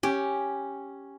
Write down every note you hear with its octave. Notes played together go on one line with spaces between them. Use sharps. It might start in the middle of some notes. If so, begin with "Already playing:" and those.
C#4 G4